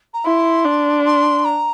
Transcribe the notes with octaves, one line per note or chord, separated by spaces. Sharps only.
A#5
E4 C6
D4
C6
A#5